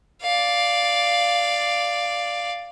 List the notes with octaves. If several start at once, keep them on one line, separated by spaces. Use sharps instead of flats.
D5 F5